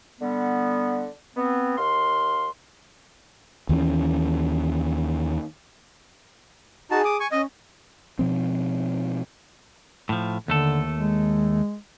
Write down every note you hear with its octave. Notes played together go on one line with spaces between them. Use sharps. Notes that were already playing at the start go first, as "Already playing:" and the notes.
D3 G3 B3
B3 C4
D#2 F5 C6
D#2 E3 F3 C#4
D#4 F#4 G#4 A5
D6 D#6
G#5 C#6
C#4 D#5
B2 F3 C4
A2 F3
D#2 D3 A3 A4
G#3